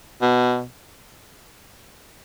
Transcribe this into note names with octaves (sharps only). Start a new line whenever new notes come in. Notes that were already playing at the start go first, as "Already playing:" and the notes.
B2